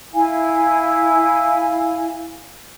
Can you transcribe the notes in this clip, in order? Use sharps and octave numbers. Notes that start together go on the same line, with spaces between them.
E4 F5 G#5